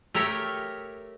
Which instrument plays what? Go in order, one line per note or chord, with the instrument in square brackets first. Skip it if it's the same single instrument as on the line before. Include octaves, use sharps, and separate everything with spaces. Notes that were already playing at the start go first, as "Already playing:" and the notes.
[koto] A3 G4 A#4 C#5 E5